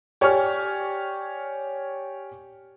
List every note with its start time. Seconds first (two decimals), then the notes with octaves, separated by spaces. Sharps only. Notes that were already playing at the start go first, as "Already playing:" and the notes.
0.21 G4 C#5 D5 G#5 C#6 F6